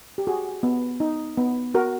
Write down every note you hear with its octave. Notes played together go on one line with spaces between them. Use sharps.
G4
F#4 G#4
B3
D#4
B3
F#4 A#4